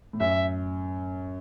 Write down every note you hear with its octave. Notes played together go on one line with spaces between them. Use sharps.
A2
F#2 E5